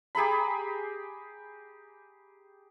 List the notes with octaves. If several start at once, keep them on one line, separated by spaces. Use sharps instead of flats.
G4 G#4 A#5 B5